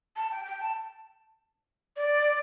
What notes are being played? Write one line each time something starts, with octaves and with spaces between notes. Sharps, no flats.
A5
G5
G5
A5
D5